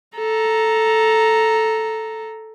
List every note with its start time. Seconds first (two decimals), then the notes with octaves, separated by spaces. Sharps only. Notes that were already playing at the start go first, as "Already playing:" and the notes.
0.17 A4 A#5